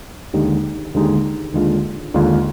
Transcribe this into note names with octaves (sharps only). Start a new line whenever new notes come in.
D#2 D3 G#3 D#4 G4
D#2 D3 G#3 D#4 G4
D#2 D3 G#3 D4 F4
D#2 D3 G#3 D4 F4